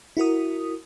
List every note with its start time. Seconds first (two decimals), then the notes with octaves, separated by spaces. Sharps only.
0.17 E4 F#4 A#4 D#6